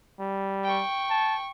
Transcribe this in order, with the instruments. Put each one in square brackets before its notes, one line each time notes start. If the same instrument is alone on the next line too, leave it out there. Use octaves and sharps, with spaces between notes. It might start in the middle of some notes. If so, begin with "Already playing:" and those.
[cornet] G3
[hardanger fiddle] G5 C#6
[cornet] A5